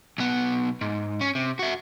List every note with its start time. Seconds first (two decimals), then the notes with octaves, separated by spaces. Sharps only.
0.18 B1 B3
0.81 G#2
1.21 C#4
1.35 C3
1.59 F#4 E5